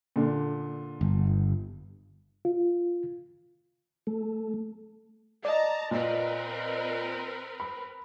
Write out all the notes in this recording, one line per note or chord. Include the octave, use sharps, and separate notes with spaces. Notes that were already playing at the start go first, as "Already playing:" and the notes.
A#2 D3
G1
F4
A3
D5 D#5 A5 A#5
A#2 C4 A#4 B4
B5